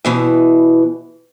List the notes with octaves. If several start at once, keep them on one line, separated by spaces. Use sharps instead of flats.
E2 B2 E3